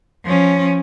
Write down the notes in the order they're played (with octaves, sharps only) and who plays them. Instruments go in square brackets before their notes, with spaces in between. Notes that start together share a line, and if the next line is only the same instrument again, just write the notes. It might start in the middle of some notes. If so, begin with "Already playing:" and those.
[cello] F3 C#4